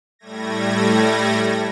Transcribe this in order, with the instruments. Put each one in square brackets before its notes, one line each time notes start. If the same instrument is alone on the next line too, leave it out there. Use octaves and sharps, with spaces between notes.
[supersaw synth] A2 G3 A3 G#6 A#6